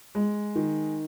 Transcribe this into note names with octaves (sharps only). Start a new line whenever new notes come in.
G#3
D#3